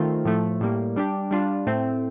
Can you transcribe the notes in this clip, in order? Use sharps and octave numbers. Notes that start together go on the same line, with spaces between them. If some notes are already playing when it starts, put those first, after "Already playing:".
Already playing: D#3 A3 C4 F4
A2 F3 A3
A2 G3 A#3
G3 D4 G4
G3 D4 F4
A2 A3 C4